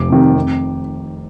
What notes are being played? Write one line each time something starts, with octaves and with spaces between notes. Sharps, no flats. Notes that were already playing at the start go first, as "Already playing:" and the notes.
Already playing: F1 D6
F2 C3 D#3
F2